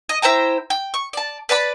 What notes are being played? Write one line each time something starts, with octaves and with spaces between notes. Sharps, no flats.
D#5
E4 C5 G5 A#5
G5
C#6
D5 A5
B4 D5 A5 B5